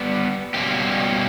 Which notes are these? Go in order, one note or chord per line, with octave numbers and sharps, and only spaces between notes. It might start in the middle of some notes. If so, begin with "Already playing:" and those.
Already playing: G3 B3 G4
B2 G3 A#3 C#4 G4